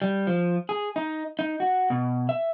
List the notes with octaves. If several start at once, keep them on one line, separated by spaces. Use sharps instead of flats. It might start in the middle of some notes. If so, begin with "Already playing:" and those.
G3
F3
G#4
D#4
D#4
F#4
B2
E5